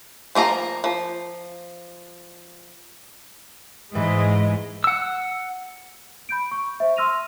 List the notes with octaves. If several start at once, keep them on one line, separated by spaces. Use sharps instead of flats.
F3 A#3 D#5 A#5
F3
G#2 E3 G#3 G#4 D#5
F#5 E6
B5 G6 D7
C#6
C5 E5
C6 E6 F6 A#6 D#7 F7